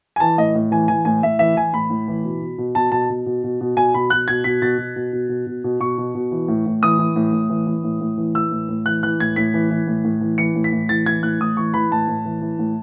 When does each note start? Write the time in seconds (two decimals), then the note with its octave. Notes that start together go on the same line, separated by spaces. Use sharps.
0.16 G#5
0.20 E3 A5
0.38 A2 D#5
0.55 A2
0.71 E3 G#5
0.88 E3 G#5
1.05 A2 G#5
1.23 A2 E5
1.39 E3 E5
1.56 E3 G#5
1.73 A2 B5
1.90 A2
2.08 E3
2.24 B2
2.41 B2
2.58 B2
2.75 B2 A5
2.92 B2 A5
3.10 B2
3.26 B2
3.44 B2
3.61 B2
3.77 B2 G#5
3.94 B2 B5
4.10 B2 F#6
4.28 B2 G#6
4.44 B2 B6
4.62 B2 A6
4.78 B2
4.96 B2
5.13 B2
5.29 B2
5.46 B2
5.64 B2
5.80 B2 C#6
5.98 B2
6.15 B2
6.31 E3
6.48 A2
6.66 A2
6.83 E3 D#6
6.99 E3
7.16 A2
7.33 A2
7.50 E3
7.67 E3
7.84 A2
8.01 A2
8.18 E3
8.35 E3 E6
8.51 A2
8.69 A2
8.86 E3 F#6
9.03 E3 F#6
9.20 A2 G#6
9.36 A2 B6
9.54 E3
9.70 E3
9.87 A2
10.05 A2
10.21 E3
10.38 E3 C#7
10.55 A2
10.64 B6
10.72 A2
10.89 E3 A6
11.06 E3 G#6
11.23 A2 F#6
11.40 A2 D#6
11.57 E3 C#6
11.74 E3 B5
11.92 A2 A5
12.08 A2
12.25 E3
12.42 E3
12.59 A2